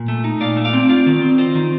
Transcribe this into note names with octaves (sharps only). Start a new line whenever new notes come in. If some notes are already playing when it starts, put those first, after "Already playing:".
Already playing: A#2
A3
D#4
A#2 D5 F5
A3
D5 F5
C4
F4 D5 F5
D#3
C4
F4 C5 D#5
D#3